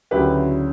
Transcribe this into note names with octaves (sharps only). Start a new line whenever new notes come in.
D2 C#3 F#3 C#4 E4 G4 B4